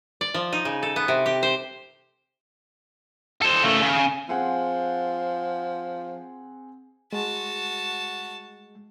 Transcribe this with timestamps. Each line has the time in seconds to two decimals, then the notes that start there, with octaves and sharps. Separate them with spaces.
0.21 D5
0.34 F3
0.53 D#4
0.65 C#3
0.83 A4
0.96 B3
1.08 C3
1.26 G4
1.43 C5
3.42 A4 C5
3.63 C#3 A3
3.81 C#3
4.29 F3 C4 G#4 F#5
7.13 G#3 F#4 A5